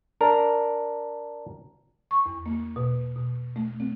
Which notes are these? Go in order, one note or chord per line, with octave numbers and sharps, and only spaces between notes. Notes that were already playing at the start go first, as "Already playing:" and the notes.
D4 A#4
C#6
E2
A#3
B2
B2
A3
C4